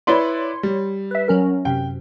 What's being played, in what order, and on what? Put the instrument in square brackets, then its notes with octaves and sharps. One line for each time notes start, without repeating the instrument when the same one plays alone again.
[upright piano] E4 B4 D5 [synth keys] C#5 C6
[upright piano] G3
[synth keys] B4 E5
F#3 C#4 A#4
[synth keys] F#2 C3 [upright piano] G5